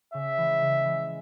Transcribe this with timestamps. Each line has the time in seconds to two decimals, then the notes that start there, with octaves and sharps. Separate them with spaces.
0.14 C#3 E5
0.38 E3 G#3
0.62 C#3
0.85 E3 G#3